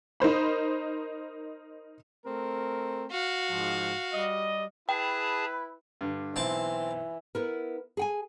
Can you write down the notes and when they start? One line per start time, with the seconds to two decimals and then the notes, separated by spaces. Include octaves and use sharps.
0.20 D#4 A#4 C5 B5
2.26 A3 C4 A#4
3.11 F#4 F5
3.50 G#2 F3
4.14 G3 D#5
4.89 E4 G#4 B4 G5 A5
6.01 G2 D3
6.36 B1 E3 C4 A5
7.35 B3 E4 A#4
7.97 G#4 G5 G#5